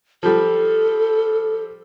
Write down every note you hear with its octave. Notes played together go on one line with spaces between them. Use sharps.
F3 G3 A4